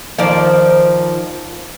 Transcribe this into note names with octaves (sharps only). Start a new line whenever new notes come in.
D#3 F3 D5